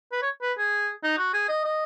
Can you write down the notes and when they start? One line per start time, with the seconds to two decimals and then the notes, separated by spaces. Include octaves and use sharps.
0.12 B4
0.22 C#5
0.42 B4
0.58 G#4
1.03 D#4
1.18 F#4
1.33 G#4
1.49 D#5
1.64 D#5